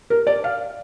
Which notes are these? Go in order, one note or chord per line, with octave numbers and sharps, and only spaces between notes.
A#4
D5
F5